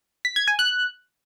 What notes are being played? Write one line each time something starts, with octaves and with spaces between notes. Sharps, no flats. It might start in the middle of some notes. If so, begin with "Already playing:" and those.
B6
G#6
G#5
F#6